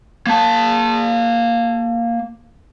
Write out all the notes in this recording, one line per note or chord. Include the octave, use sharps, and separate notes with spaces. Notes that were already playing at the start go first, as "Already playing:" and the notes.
A#3 A5